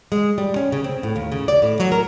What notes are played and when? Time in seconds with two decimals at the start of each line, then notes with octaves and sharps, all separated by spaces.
0.12 G#3
0.38 G3
0.56 C#4
0.72 C#3
0.84 C4
1.03 A2
1.16 D#2
1.32 C#3
1.48 D5
1.62 A2
1.80 F#3
1.92 A#4